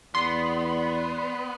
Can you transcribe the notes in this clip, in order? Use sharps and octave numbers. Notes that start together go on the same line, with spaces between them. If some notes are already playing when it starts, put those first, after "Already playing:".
E2 B3 D5 C6